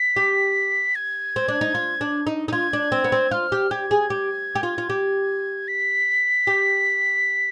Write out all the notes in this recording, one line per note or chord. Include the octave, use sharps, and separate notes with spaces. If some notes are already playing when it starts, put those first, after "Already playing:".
Already playing: B6
G4
G#6
C4
D4
D#4
F4
D4
D#4
D#4
F4 G#6
D4
C4
B3
C4
F4 F6
G4
G4 G#6
G#4
G4
G4
F4
F4
G4
B6
G4